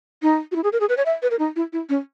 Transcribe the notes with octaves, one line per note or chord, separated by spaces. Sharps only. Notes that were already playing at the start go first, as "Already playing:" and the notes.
D#4
F#4
E4
G#4
A#4
G#4
B4
C#5
E5
B4
A#4
D#4
E4
E4
C#4